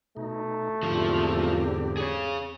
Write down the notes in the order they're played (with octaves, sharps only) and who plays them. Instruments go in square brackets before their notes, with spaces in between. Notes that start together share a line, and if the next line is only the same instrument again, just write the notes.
[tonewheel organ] B2 D#4 [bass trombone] A3
[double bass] E2 C4 [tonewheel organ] G#2 D3 G4 [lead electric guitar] F3
[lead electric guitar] G#4 C#5